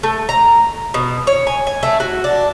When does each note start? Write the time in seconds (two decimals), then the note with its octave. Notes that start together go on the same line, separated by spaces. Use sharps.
0.03 A3
0.29 A#5
0.94 B2
1.27 C#5
1.47 G#5
1.67 G#5
1.83 A3
2.00 F#4
2.24 D4